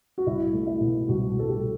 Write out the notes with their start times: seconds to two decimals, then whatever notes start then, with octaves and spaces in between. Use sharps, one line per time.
0.18 F#4
0.26 C2 E4
0.53 A3
0.67 E4
0.81 B2
1.08 C2 F#4
1.36 C2 A4
1.49 G4